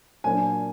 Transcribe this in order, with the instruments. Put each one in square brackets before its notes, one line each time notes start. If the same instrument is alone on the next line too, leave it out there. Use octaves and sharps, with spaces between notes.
[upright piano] A#2 F#3 A#3 D4 G#5